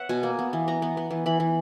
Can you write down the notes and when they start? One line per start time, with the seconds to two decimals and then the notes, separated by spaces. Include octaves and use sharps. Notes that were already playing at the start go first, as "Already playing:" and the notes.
Already playing: B4 C#5 E5 F#5
0.09 B2 G#5
0.23 A#3
0.39 B3
0.53 E3
0.68 B3 A#5
0.82 B3
0.97 B3
1.11 E3
1.26 E3 B5
1.40 E3